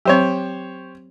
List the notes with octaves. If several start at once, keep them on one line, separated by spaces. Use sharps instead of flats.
F#3 C4 G4 C5 C#5